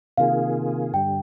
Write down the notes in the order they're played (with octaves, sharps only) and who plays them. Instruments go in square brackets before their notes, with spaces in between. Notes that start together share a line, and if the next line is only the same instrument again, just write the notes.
[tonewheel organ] C3 D#3 A#3 F4 G#4 [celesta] F5
[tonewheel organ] G2 D3 G3 [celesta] G5